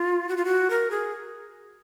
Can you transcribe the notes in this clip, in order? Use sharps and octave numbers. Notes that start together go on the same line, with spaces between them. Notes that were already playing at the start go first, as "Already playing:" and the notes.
Already playing: F4
F#4
F4
F#4
A#4
G#4